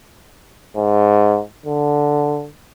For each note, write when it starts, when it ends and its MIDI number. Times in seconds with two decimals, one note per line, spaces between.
0.76 1.40 44
1.66 2.48 50